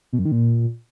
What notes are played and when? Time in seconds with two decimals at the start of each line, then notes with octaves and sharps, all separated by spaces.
0.13 B2
0.19 F#2
0.25 D#3
0.32 A#2